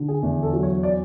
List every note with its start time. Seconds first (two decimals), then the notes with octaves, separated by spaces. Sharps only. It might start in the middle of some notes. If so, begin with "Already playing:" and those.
Already playing: D3
0.08 G#4
0.23 E2
0.43 A4
0.53 F#3
0.63 C#5
0.83 D5